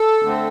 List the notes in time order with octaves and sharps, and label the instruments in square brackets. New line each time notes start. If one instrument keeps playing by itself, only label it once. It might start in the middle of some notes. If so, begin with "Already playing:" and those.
Already playing: [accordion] A4
D3 A3 C4